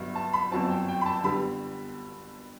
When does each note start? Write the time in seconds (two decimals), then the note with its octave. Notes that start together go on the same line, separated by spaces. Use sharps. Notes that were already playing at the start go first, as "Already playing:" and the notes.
Already playing: G1 G2 F#3 E5
0.15 A5
0.33 B5
0.51 G1 F#2 F#3 C4 A5
0.70 G5
0.88 G5
1.01 B5
1.06 A5
1.24 D3 G3 B3 B5